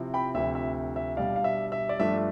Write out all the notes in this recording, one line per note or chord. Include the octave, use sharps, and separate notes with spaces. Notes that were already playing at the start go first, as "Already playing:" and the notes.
Already playing: C3 F3 C4 E4
G5 B5
D2 C3 F3 E5
E5
E5
B2 G3 D4 D5 F5
F5
E5
E5
D5
G2 F3 A3 D4 E5